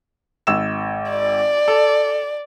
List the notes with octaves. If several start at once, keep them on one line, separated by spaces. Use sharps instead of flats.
G#1 E6 E7
D5
A4